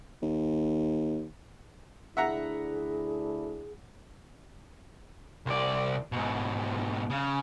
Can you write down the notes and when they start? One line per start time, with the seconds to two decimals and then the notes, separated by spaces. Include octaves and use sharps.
0.22 D#2
2.17 D2 D4 E4 G#4 E5 F#5 A#5
5.46 C2 D5
6.12 G#2 B2
7.10 C#3